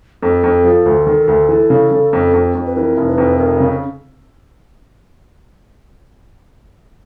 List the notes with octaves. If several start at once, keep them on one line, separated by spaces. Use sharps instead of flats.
F2 A4
F2
F3
D2
D#3
D2
E3
C#3
C#3
F2
F2
F2
B4
E3 A#4
F1
B4
F2
F1 A#4
C#3